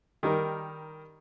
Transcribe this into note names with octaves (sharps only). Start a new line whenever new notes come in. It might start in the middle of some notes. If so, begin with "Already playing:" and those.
D#3 G3 A#4